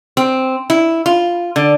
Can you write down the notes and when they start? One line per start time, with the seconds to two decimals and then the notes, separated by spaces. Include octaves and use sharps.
0.17 C4
0.70 E4
1.06 F4
1.56 D3